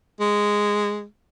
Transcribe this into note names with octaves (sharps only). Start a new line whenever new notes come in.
G#3